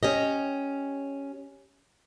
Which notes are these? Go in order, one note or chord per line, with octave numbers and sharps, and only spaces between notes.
C#4 G4 D#5